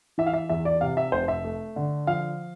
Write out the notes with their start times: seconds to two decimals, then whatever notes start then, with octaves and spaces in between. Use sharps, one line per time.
0.18 E3 E5
0.26 F5
0.33 E5
0.49 E2 E5
0.65 D5
0.81 C3 F5
0.97 E5
1.12 F1 C5
1.28 E5
1.44 A3
1.76 D3
2.07 F3 F5